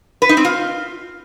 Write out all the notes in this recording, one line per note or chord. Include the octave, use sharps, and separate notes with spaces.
B4
D#4
C4
F4